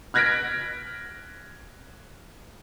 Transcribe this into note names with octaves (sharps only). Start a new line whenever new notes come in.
F6 F#6 G#6 A#6 B6 D7